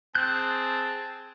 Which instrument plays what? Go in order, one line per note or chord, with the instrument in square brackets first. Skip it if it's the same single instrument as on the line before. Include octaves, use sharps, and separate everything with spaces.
[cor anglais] C4 [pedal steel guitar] G#4 G6 [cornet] A5 [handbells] F#6